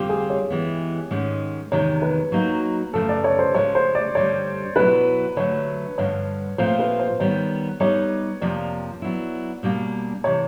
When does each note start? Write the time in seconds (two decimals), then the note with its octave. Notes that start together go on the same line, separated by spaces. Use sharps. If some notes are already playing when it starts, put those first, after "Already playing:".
Already playing: F2 D3 G3 C4 F4 G4
0.09 G#4
0.30 C#5
0.50 E3 G#3 B3
1.11 G#2 D#3 G#3 C#4
1.72 E2 C3 D#3 G#3 C#5
2.02 B4
2.32 F#3 A#3 D#4 F#4
2.93 F#2 C#3 F3 A3 A4
3.09 D5
3.24 C#5
3.39 C5
3.54 C#3 F3 G#3 C#5
3.75 C5
3.95 D5
4.15 G2 D3 G3 C#5
4.76 B2 F#3 B3 E4 B4
5.37 D3 F#3 A3 C#5
5.98 G2 D3 F3 C#5
6.58 A#2 F3 A3 C4 F4 C5
6.79 B4
6.99 C5
7.20 D#3 G3 B3 C#5
7.80 G3 B3 D#4 C#5
8.41 F2 C3 F3 A#3 D5
9.02 F#3 B3 E4
9.63 B2 G3 A#3 D4
10.24 C3 E3 C#5